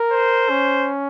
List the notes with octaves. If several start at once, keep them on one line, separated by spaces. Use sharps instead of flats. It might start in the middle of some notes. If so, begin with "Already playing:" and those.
Already playing: A#4
C5
C#4